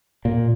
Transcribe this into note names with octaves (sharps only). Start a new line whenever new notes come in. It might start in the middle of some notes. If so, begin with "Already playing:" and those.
A#2